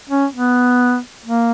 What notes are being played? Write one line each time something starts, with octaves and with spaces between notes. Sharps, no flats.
C#4
B3
A#3